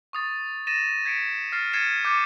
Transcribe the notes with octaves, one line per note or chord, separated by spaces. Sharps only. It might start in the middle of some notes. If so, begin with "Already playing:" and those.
C#6 D#6 A6
A6 A#6 D#7 E7
G#6 B6 C#7 D7
F6 A6 A#6 C7
G#6 A6 C7 C#7 D#7 E7
D6 G6 C#7